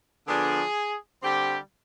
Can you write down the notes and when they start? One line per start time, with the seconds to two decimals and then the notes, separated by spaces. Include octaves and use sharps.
0.27 D3 F3 B3 D4 G#4
1.23 D3 G3 C4 G4